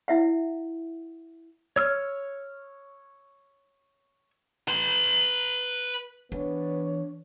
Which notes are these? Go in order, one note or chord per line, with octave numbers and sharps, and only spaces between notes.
E4 E5 F#5
C#5 E6 F6
B4 C6
E3 B3 D4 C#5